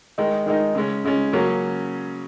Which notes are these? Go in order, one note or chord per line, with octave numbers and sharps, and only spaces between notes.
D#3 G#3 D#4
D#3 G#3 D#4
C#3 G#3 C#4
C#3 G#3 C#4
C#3 F#3 A#3 C#4